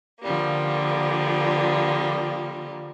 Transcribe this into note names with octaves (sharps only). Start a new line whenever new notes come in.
D3 F3 G3 A#3